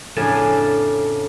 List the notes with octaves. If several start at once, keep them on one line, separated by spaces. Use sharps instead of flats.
F2 A2 C#3 D4 G#5 A5